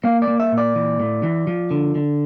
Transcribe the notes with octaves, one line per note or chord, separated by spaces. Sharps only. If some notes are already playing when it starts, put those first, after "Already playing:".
A#3 F5
D5
A#3
E5
A#2
D5
E3
A2
E3
F3
D3
D3